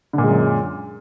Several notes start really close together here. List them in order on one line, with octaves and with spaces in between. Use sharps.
D3 A#2 G#3 F#2